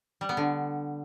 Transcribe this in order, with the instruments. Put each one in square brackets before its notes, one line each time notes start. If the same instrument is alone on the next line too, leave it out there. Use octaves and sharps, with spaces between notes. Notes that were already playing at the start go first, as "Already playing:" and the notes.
[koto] G3
B3
D3